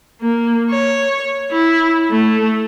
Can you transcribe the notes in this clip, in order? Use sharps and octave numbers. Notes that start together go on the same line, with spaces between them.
A#3
C#5
E4
A3